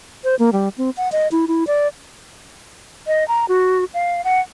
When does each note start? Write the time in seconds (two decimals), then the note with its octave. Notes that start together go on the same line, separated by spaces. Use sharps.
0.24 C5
0.39 A#3
0.53 G3
0.78 C4
0.97 F#5
1.12 D#5
1.32 E4
1.48 E4
1.67 D5
3.07 D#5
3.28 A#5
3.49 F#4
3.94 F5
4.24 F#5